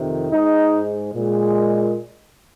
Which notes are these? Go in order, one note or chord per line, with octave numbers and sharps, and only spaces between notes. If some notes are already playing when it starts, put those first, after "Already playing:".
Already playing: F2 C3 D#3
G#2 G#3 D#4
A#2 G#3